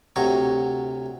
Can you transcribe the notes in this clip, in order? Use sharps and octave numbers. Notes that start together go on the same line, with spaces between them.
D2 C3 F#3 C#5 A#5